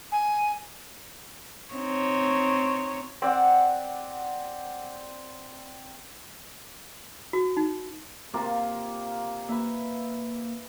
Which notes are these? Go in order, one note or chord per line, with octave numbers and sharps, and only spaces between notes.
G#5
C4 D#4 C#5
C4 D5 F#5
F#4
D#4
C3 A#3 F4
A#3 B4 E5